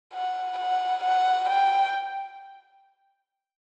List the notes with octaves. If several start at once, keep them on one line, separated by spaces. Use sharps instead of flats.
F#5
F#5
F#5
G5